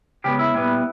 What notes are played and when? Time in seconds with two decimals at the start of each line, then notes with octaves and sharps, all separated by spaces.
0.24 C#3 G#3 B3 G4
0.39 E4
0.53 A#2 G3 B3